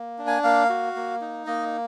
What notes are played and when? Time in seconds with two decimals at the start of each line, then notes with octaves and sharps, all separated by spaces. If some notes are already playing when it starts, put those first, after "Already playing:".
Already playing: A#3
0.18 D4
0.27 G#5
0.44 A#3 F5
0.70 F#4
0.96 A#3
1.21 D#4
1.47 A#3 D#5